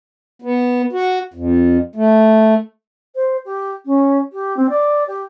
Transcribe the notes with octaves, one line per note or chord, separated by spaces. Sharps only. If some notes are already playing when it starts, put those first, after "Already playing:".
B3
F#4
F2
A3
C5
G4
C#4
G4
C4
D5
G4